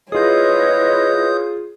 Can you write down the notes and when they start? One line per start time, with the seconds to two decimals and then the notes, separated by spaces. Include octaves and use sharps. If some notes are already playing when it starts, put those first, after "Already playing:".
0.12 E4 F4 G#4 B4 C#5 D#5 D#6 G6